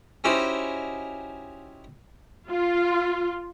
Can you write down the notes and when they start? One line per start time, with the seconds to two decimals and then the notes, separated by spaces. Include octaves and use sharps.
0.24 C#4 D#4 E4 F#4 G4 C5
2.49 F4